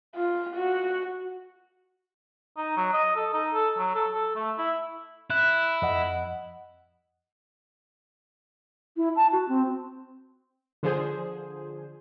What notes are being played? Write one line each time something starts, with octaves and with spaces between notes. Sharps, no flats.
F4
F#4
D#4
F#3
D#5
A4
D#4
A4
F#3
A4
A4
A3
E4
E4 F#6
F2 D#5 F#5
E4
A5
F#4
C4
D3 F3 G#4 C5